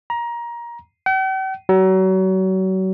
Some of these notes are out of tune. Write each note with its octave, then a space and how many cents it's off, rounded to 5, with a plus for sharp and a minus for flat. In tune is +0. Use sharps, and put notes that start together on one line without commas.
A#5 +20
G5 -45
F#3 +35